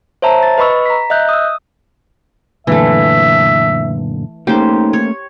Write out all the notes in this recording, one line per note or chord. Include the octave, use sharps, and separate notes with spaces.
C5 C#5 E5 A5 A#5
A6
B4 D#5 B5 C#6 E6
A#5 B6
D#5 E5 F#6 G6
D#6 E6
F#2 A#2 D3 E3 A3 E5
A3 A#3 C#4 D#4 G4 C5
C#5